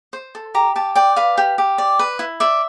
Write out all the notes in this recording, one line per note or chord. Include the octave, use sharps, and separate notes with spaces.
C5
A4
G4 A#5
G4 A5
D5 G5
B4 F5
G4
G4
D5
B4
E4
D5 E5